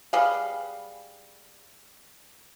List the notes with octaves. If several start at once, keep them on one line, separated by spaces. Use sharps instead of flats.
G3 G#4 B4 F5